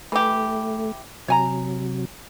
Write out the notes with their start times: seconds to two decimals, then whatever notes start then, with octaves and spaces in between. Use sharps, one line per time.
0.12 E3 A3 G4
1.28 C3 F#3 C#5 G#5 A#5